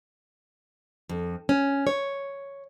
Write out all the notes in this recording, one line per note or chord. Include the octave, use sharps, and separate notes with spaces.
F2
C#4
C#5